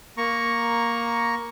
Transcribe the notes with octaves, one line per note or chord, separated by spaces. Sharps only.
A#3 A#5 C#6